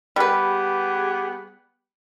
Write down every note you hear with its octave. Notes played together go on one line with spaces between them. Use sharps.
G3 B3 G4 G#4 B4